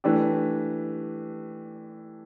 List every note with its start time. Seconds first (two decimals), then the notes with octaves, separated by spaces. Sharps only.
0.04 E3 A3 D4 G4